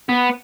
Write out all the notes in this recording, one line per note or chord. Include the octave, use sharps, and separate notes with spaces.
B3